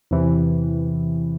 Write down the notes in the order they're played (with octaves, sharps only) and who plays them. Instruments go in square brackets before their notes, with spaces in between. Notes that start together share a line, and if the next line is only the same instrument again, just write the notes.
[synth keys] E2 C3 E3